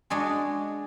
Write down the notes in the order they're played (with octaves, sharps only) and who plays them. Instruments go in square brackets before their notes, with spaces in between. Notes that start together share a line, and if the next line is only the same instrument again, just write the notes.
[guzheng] G#3 D4 F#4 G#4